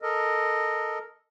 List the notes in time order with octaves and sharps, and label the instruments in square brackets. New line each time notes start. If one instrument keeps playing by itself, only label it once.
[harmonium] A4 A#4 D#5